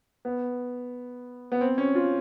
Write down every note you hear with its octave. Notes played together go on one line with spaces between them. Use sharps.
B3
B3
C4
C#4
F4